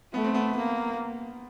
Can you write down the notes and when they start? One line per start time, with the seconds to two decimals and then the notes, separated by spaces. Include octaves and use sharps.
0.14 A3 B3
0.24 C4
0.35 B3
0.57 A#3